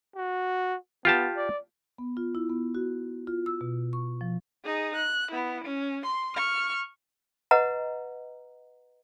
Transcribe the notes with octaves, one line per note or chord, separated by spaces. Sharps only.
F#4
B3 F4 G4 A5
D5
B3
F4
E4
B3
F#4
F4
E6
B2
C#6
F3
D#4 G#4
F#6
B3 E4
C#4
C6
C#6 F6
B4 D#5 F#5 A#5